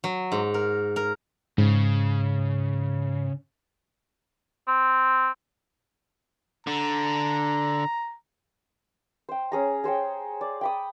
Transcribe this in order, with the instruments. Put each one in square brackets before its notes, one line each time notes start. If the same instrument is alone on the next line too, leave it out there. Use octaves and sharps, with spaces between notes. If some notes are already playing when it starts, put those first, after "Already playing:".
[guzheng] F#3
G#2
A#4
A#4
[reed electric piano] G#2 [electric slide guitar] C#3
[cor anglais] C4
[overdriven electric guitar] D3 [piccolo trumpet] A#5
[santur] C5 G5
C#4 G#4 A#5
G#4 C5 C#5 G5
D5
G5 B5 D#6